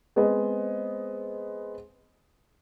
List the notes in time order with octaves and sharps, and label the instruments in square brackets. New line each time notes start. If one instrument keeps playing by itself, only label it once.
[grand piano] G#3 B3 C4 G#4 C5 D#5